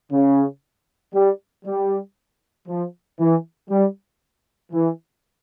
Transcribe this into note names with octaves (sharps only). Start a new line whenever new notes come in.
C#3
G3
G3
F3
E3
G3
E3